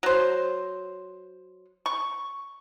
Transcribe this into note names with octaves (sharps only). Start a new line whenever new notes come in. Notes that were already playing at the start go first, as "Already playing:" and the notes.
F#3 C5
C#6